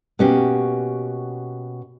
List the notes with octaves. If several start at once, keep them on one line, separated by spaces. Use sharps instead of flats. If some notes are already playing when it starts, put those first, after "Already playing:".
B2 A#3 C#4 F#4 G4